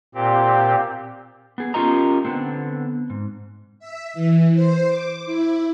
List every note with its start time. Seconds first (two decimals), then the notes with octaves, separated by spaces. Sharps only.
0.15 A#2 C4 G4
1.58 B3 G#4
1.74 C#4 F4 G4 A#4 D#5 A#5
2.25 D3 B3 C4
3.10 G#2
3.79 E5
4.14 E3
4.54 C5
4.88 D6
5.26 E4